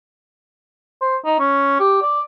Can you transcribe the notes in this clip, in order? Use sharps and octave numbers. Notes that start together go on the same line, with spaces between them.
C5
D#4
C#4
G4
D5